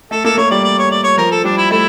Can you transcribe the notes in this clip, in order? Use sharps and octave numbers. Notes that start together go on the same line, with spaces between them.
A3 A4
A#3 A4
A#3 C#5
G3 D5
D5
C#5
D5
C#5
F3 A#4
A4
G3 D4
E4
A3 E4